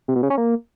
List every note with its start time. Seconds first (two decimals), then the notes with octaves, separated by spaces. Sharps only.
0.08 C3
0.16 B2
0.23 C#3
0.30 C#4
0.38 A#3